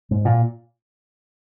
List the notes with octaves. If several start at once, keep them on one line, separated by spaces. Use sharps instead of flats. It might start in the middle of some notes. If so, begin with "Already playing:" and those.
G#2
A#2